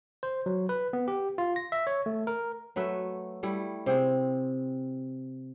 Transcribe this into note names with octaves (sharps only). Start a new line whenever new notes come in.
C5
F#3
B4
B3
G4
F4
A#6
E5
C#5
A3
A#4
F#3 A3 B4 E5
G3 A3 E4
C3 C4 G#4